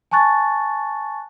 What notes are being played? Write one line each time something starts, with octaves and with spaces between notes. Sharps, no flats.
G#5 A5 C#6 F#6 A6